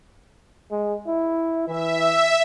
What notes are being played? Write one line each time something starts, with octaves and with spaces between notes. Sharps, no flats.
G#3
E4
E3 E5